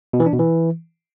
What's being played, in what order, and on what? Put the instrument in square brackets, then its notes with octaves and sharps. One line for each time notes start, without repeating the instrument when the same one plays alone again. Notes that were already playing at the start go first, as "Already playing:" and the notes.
[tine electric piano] B2
E3
D4
B2
E3